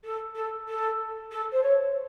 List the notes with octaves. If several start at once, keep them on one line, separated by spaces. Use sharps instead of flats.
A4
A4
A4
A4
C5
C#5